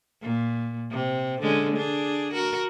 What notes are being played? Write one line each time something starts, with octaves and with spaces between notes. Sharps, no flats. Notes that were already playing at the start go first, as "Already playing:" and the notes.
A#2
C3
D3 G#3 C#4
D4 G#4
F#4 A#4